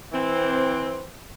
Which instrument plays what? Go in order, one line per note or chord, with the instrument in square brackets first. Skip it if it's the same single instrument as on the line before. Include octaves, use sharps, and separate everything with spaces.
[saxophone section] E3 C4